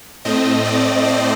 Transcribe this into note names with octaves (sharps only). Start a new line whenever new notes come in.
A2 A3 C4 D#5
D5
C5